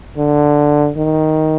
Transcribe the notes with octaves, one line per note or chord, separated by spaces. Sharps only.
D3
D#3